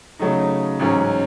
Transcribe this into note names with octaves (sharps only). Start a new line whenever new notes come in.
C#3 F#3 A3 D#4
A1 G#2 F#3 C#4